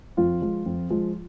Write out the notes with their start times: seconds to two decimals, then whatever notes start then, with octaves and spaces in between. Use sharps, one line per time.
0.17 F2 F4
0.42 F3 G#3
0.66 F2
0.90 F3 G#3